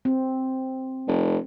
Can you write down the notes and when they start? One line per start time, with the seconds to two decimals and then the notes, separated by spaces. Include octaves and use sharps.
0.05 C4
1.08 F1